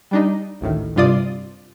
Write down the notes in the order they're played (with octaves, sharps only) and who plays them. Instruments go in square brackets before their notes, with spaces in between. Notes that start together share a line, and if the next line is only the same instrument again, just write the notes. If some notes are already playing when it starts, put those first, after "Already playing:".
[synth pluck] G3 D4 D#4
A1 D2 A2 D#3
G2 C3 F4 D5 D#6